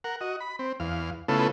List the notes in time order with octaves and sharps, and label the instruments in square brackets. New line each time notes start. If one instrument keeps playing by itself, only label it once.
[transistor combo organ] A#4 F#5
F#4 D#5
B5
C4
E2 F5
C#3 A3 B3 E4 F4 A4